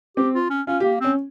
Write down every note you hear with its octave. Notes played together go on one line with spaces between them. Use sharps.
C4 G4
F4
C#4
C#4 F4
A#3 G4
C4 C#4